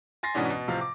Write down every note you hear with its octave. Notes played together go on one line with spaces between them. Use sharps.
G#5 C6 A6 A#6 C7
G#2 B2 E3 B3 C#4 D4
B2
A2 C3 F3 F5
D6